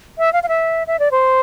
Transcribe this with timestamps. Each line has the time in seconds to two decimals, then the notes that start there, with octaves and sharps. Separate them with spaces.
0.18 E5
0.33 F5
0.43 F5
0.49 E5
0.87 E5
0.99 D5
1.11 C5